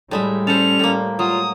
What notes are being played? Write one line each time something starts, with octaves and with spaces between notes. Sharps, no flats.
A2 G3 G#3 E5
C#4 A4 C5 F7
A2 A#3
F#3 F4 D#6